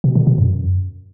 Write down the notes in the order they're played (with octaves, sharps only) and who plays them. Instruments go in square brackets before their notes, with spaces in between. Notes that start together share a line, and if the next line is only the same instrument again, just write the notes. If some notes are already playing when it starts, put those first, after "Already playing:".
[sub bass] B2
D3
B2
F#2